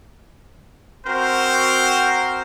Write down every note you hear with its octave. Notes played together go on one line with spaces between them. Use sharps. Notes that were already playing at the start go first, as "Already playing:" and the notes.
C4 F#4 A#4 C5